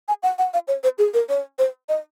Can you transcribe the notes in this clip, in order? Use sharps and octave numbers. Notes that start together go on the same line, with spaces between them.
G#5
F#5
F#5
F5
C#5
C5
G#4
A#4
C#5
C5
D#5